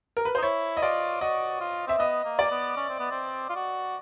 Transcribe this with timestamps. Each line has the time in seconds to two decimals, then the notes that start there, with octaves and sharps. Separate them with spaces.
0.17 A#4
0.25 B4
0.35 D#4 C5
0.43 E4 C#5
0.77 D#5
0.82 F4 D5
1.21 F#4 D#5
1.61 F4
1.87 C4 E5
1.99 B3 D#5
2.25 A#3
2.39 D5
2.51 B3
2.77 C#4
2.89 C4
3.00 B3
3.11 C4
3.50 F4
3.56 F#4